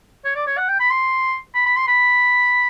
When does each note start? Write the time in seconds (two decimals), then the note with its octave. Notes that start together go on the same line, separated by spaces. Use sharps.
0.25 C#5
0.35 D5
0.47 C#5
0.57 F#5
0.68 G5
0.80 B5
0.90 C6
1.54 B5
1.66 B5
1.76 C6
1.87 B5